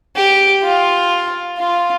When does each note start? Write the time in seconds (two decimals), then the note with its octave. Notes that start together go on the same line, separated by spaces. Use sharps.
0.16 G4
0.63 F4
1.59 F4